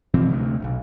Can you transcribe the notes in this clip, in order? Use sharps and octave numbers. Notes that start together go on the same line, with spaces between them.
B2 E3 F3 C4
D2 C3
D1 B1